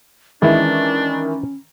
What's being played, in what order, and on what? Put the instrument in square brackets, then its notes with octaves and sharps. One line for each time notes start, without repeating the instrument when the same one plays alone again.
[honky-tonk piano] D#3 E3 [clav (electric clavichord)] G#3 E4 [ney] C#4 [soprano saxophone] D4